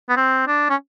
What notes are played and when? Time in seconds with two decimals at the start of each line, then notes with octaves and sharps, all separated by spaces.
0.09 B3
0.17 C4
0.48 D4
0.70 C#4